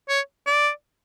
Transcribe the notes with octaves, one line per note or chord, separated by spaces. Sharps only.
C#5
D5